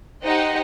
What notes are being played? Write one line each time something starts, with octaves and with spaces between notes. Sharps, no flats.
D#4 G4 C5 D#5 F#5